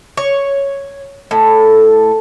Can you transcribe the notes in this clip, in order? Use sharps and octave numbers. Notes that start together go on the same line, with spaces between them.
C#5
A2